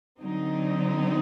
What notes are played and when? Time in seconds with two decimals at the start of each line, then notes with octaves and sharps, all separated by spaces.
0.21 D3 F#3 C4 D#4